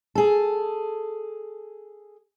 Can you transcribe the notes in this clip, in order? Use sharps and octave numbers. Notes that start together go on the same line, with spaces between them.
G#4 A4